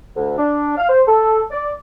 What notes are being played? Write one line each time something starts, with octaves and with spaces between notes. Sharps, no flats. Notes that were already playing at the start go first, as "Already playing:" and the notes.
D2
D4
F5
C5
A4
D5